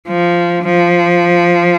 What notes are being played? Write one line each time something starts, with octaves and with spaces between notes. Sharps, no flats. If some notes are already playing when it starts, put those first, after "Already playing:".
F3
F3